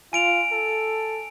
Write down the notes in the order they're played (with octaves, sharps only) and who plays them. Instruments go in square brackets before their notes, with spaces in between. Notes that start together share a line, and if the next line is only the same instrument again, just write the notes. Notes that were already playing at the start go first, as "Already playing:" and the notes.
[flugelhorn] F4 [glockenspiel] G#5 D7 F7
[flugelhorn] A4